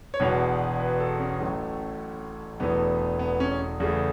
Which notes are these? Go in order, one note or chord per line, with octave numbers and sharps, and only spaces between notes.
C#5
E1 E2 B2 B4
B4
A4
C#4
A1 A2 F#3 A3
E1 E2 E3 A3 B3
B3
C#4
E2 C#3 A3